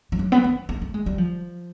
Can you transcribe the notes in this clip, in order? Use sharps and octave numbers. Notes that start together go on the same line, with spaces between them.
F3
F#3
B3
C4
A#3
A3
G#3
G3
F3